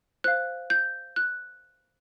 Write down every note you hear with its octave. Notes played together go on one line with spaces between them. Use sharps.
C5 F5 F#6
G6
F#6